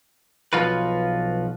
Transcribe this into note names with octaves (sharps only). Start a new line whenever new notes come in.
B1 F3 F4 F#4 B4